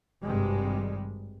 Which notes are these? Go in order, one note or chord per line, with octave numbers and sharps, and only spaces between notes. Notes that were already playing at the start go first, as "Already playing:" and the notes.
G#1 G2 C3 G3 G#3